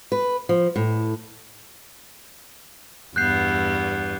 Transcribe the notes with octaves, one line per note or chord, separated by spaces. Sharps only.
B4
F3
A2
E2 G2 B3 F#6 G6 C7